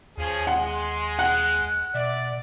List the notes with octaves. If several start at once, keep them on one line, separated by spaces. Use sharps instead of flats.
D#2 F3 C#4 G#4
G#3 F#5 C6
F#5 F#6
B2 D5 E5